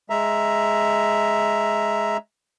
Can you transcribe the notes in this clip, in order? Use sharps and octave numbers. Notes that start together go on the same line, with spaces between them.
G#3 E5 A#5